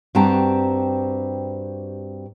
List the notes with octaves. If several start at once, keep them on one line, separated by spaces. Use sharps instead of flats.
G2 C4 F#4 G4 A5 A#5